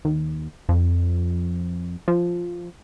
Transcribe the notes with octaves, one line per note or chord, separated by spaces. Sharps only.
D#2
F2
F3